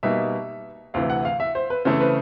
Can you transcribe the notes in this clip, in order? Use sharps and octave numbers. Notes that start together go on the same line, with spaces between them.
B2 G3 A#3 D#4 E5
D2 C3 E3 F5
F#5
F5
E5
C5
B4
C#3 E3 A3 C4 C5
B4